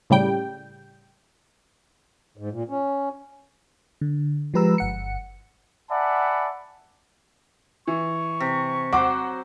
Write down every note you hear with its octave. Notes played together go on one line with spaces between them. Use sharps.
A2 C#3 G3 G5
G#2
A#2
C#4
D3
F3 G#3 G4 B4 A#5 E6
G1 F#5 C#7
D5 E5 F#5 G#5 A5 B5
E3 C#6
C3
F#3 C5 F#5 D6